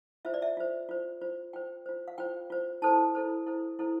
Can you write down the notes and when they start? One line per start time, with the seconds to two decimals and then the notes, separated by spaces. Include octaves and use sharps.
0.25 F4 C5 E5
0.34 D5
0.42 E5
0.57 F4 C5
0.89 F4 C5
1.21 F4 C5
1.53 F4 C5 G5
1.86 F4 C5
2.08 F5
2.18 F4 C5 G5
2.50 F4 C5
2.82 E4 A4 C5 A5
3.15 E4 A4 C5
3.46 E4 A4 C5
3.79 E4 A4 C5